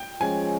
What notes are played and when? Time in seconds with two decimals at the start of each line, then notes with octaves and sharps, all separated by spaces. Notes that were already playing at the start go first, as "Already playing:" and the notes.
Already playing: G5
0.20 F3 G#3 C#4 G#5